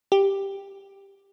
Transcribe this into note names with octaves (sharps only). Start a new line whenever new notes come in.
G4